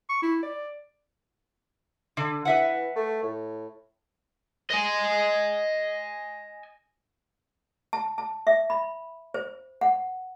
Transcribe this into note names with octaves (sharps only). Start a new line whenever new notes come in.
C#6
E4
D5
D3
E3 B4 E5 F#5
A3
A2
D#5 G#5
A5
A5
E5
B5
C5
F#5